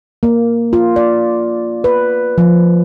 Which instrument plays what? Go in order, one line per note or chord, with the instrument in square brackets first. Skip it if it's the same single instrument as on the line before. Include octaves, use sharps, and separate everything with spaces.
[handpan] A#3
F4
D5
B4
F3